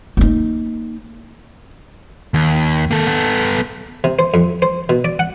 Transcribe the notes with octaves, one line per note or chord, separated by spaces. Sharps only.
A#3 D#4
D#2
A#3 A4
B3 A4
C3
C5
F2
C5
B2
D5
F#5